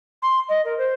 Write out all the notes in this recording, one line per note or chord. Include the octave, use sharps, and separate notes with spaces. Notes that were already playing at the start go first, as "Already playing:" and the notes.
C6
D#5
A#4
C5